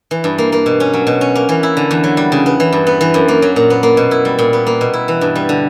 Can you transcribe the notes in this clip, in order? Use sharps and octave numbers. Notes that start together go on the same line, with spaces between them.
E3
G2
A#3
A#3
B2
C#4
F#3
B2
C#4
A#3
E3
E4
D3
E2
F#3
G3
C#3
B3
E3
G2
B3
E3
F#2
A#3
F#3
A#2
B3
A#3
B2
E4
G3
A#2
B3
A#3
B2
E4
E3
G2
G3
D3